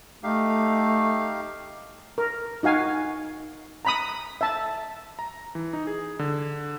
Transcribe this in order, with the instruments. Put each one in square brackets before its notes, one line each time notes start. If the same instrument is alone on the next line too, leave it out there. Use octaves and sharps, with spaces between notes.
[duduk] A3 [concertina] D#4 G4 F5
[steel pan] A#4
D#4 F#4 F5 G#5
A#5 B5 D#6
E5 A5
[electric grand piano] A#5
E3
D#4
G#4
D3